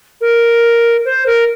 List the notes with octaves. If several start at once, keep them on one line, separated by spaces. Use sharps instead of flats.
A#4
C5
A#4